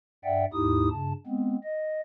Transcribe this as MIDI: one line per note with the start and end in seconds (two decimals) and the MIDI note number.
0.24 0.45 43
0.24 0.45 74
0.24 0.45 76
0.24 0.45 78
0.24 0.45 79
0.53 0.89 39
0.53 0.89 44
0.53 0.89 63
0.53 0.89 64
0.53 0.89 67
0.53 0.89 87
0.90 1.13 43
0.90 1.13 49
0.90 1.13 81
1.27 1.57 56
1.27 1.57 59
1.27 1.57 60
1.64 2.01 75